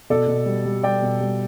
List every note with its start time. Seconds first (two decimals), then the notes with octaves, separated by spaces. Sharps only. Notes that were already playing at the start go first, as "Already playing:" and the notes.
0.10 B2 A4 D5
0.28 B2
0.46 G3
0.65 G3
0.83 G3 D5 G5
1.02 B2
1.20 G3